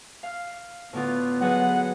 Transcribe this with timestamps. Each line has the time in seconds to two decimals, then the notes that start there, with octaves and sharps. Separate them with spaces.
0.23 F5 F6
0.93 A2 D3 B3 F4
1.41 F#3 G#4 B4 F#5